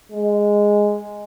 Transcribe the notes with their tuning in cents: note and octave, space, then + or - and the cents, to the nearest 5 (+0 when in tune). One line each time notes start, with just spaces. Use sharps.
G#3 -5